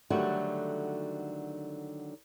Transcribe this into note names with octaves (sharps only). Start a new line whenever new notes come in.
D3 D#3 F#3 G3 A3 F#4